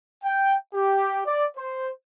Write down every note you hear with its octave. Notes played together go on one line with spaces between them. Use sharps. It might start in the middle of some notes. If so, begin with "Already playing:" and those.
G5
G4
D5
C5